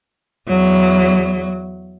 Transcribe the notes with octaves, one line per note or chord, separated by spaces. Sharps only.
E2 F#3